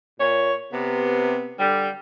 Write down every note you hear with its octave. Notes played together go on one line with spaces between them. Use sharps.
A#2 C#5
C3 B3
D3 G3